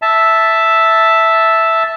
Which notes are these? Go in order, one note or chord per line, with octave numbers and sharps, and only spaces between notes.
E5 A5